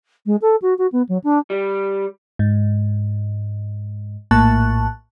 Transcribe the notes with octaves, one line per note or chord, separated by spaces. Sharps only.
G#3
A4
F#4
F#4
B3
F#3
D4
G3
G#2
A#1 A2 A#3 A5 C#6 F#6